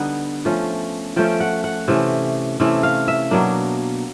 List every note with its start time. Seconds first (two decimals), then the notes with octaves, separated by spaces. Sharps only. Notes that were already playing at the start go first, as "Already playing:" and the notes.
Already playing: D3 G3 B3 D#4 F#5
0.45 F3 A3 C#4
1.16 F3 A3 C#4 G5
1.40 F#5
1.64 F#5
1.88 C3 E3 A3 C#4
2.60 C3 E3 A3 C#4
2.83 F5
3.08 E5
3.31 B2 F#3 A#3 D4